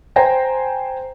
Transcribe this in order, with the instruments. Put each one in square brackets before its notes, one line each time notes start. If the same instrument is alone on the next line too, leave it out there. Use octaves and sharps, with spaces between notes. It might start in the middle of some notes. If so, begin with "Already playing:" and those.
[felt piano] C5 G5 G#5 A#5 A#6